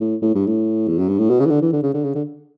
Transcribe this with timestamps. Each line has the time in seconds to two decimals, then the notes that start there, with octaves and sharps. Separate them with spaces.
0.01 A2
0.22 A2
0.35 G2
0.47 A2
0.88 E2
0.99 F#2
1.08 G2
1.19 A2
1.30 B2
1.40 C#3
1.46 E3
1.50 D3
1.62 E3
1.73 D3
1.83 C#3
1.94 D3
2.04 C#3
2.15 D3